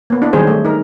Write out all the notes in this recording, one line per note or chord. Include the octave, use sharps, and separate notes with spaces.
A#3 B3
D4 E4
D#3 F#3 G3 G#4 C5
A3
D#4 A#4